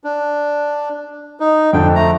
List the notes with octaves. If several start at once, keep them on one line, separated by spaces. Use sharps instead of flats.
D4
D#4
F2 D3 D4 G5
A3 A#5